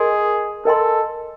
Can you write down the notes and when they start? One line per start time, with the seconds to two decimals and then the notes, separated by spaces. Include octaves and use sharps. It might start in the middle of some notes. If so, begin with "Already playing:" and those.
Already playing: G#4 A#4 D#5 G#5 C6
0.65 A4 A#4 D#5 G#5 C6